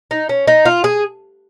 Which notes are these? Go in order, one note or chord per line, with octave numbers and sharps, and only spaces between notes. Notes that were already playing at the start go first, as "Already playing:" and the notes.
D#4
C#4
D#4
F4
G#4